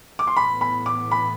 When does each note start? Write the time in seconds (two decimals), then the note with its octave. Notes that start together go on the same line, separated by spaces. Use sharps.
0.19 D6
0.27 C6
0.36 A2 E3 B3 B5
0.61 B5
0.86 D6
1.12 B5